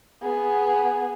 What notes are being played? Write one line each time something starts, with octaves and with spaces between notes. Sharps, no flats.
B3 G#4